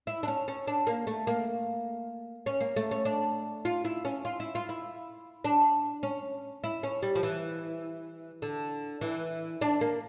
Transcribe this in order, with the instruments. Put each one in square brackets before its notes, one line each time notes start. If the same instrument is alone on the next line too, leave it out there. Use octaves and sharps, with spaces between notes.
[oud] E4
D4
C#4
C#4
D4
A#3
A3
A#3
C#4
A#3
A3
C#4
D4
F4
E4
C#4
F4
E4
F4
E4
D4
C#4
E4
C#4
G3
F3
E3
D3
E3
D4
A#3